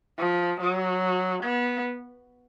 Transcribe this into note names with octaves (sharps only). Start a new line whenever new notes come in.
F3
F#3
B3